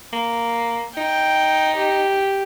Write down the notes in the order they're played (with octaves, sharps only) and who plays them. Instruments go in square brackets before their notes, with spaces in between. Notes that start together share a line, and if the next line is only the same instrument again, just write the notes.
[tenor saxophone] A#3
[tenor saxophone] D#4 [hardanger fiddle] G5
[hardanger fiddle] G4